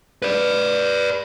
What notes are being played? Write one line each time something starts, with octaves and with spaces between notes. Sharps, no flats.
B4 D5